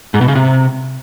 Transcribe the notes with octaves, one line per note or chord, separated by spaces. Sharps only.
G#2
B2
C#3
C3